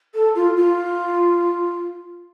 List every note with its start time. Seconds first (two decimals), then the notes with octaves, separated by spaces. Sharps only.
0.15 A4
0.35 F4
0.57 F4